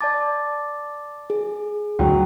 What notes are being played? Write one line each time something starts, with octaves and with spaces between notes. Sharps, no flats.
D5 A5 D6 A6
G#4
D2 F#3 G5